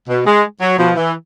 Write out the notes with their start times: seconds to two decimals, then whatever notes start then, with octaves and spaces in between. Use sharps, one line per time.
0.09 B2
0.26 G#3
0.61 F#3
0.78 B2 F3
0.96 E3